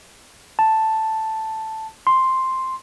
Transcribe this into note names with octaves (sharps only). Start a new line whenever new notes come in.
A5
C6